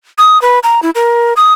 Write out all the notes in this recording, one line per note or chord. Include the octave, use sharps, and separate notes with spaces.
D#6
B4
A#5
E4
A#4
D#6